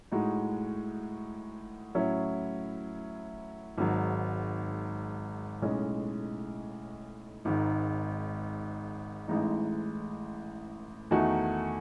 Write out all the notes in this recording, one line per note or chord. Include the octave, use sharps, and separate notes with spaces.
A2 G#3 D#4 F#4
A2 F#3 C#4 E4
G#1 G#2 F#3
B1 A2 G#3 C#4
G#1 G#2 D#3
A1 A2 E3 G#3 D#4
E2 D#3 A3 D#4 F#4